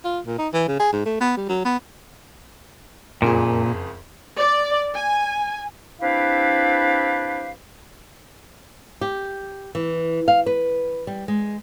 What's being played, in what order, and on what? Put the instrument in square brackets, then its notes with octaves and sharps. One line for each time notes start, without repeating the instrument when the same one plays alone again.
[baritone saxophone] F4
A#2
D#4
E3
C#3
G#4
G#2
A3
B3
G3
F#3
B3
[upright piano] F#1 F2 G#4 [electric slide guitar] A#2
[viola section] D5
G#5
[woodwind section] C4 D4 E4 G4 B4 F5
[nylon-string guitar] G4
E3
F5
B4
G3
G#3